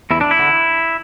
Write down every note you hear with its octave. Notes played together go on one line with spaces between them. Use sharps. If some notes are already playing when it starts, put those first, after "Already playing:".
E2 E4
D4
E4
D3